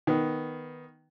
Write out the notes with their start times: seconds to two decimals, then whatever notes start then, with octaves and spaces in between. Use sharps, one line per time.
0.07 D#3 B3